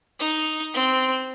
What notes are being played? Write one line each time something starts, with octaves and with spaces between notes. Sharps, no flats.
D#4
C4